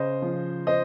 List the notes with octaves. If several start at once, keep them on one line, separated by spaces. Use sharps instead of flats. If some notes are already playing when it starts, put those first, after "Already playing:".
Already playing: C#3 C5 D#5
F3
C5 D#5